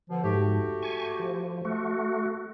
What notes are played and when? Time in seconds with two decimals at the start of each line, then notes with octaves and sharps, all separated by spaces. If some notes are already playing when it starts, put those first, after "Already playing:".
0.10 B2 D3 F3
0.24 G#2 A3 F#4 G4
0.83 G#5 C#6
1.19 F3
1.65 A3 F#4